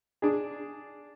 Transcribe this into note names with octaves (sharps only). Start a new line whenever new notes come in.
D4 G#4